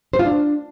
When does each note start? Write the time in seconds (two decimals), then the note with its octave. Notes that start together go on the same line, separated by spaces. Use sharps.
0.13 C5
0.19 F4
0.25 D4